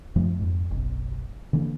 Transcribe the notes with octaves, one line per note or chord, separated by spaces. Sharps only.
F#2 F3 A3
F2 G#2
F#1 B1
D3 E3 A#3